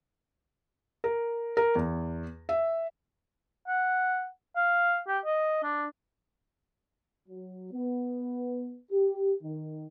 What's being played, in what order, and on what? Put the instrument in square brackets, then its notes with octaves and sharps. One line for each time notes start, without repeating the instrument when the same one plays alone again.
[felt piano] A#4
A#4
E2
E5
[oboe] F#5
F5
G4
D#5
D4
[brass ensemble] F#3
B3
G4
D#3